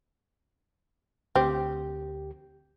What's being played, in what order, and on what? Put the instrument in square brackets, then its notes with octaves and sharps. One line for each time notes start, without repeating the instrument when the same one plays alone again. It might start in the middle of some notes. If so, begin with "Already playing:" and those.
[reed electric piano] D2 G4 [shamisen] C4